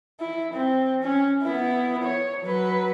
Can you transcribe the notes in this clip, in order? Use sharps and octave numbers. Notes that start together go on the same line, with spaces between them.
E4
C4
C#4
B3 E4
C#5
F#3 B4